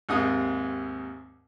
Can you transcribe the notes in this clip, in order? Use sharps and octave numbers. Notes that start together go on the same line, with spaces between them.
D#2 G#2 C3 D#6